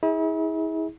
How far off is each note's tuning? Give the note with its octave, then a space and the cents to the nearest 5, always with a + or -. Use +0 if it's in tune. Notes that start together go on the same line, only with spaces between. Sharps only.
E4 -40 G#4 -10